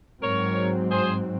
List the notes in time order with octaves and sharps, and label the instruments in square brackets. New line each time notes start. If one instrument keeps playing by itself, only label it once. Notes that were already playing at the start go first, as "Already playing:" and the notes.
[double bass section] G#2 F#3 C4 [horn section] A#4 C#5
[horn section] G#4 C5